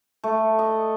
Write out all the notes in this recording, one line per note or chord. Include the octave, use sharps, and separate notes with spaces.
A3
D#5